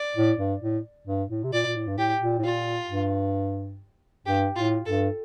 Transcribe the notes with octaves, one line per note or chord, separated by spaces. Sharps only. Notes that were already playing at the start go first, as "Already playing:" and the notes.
Already playing: D5
A2
G2
A2
G2
A2
C3
A#2 D5
A#2
A2
G2
A2 G4
A#2
A2
A#2 F4
G2
G2 G4
A2 F4
G2 A4